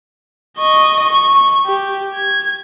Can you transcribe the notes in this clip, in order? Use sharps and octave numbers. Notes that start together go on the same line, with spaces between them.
D#5 C#6
C#6
G4
G#6